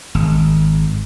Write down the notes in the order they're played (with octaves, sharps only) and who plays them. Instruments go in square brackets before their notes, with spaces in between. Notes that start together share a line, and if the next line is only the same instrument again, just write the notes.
[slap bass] G#1